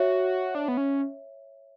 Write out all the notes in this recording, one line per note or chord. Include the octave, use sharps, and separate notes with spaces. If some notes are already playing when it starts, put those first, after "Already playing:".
Already playing: F#4 C#5 E5
D4
B3
C#4